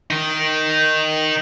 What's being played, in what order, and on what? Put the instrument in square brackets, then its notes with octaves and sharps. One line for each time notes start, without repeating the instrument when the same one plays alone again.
[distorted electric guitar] D#3 D#4